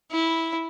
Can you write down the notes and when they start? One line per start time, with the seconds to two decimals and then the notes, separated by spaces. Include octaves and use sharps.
0.12 E4